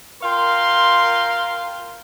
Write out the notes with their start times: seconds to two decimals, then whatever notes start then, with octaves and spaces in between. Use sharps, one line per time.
0.22 F4 A#4 F5 G5 C6